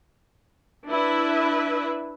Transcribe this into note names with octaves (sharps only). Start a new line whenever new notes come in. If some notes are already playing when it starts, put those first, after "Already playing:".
D4 E4 B4 E5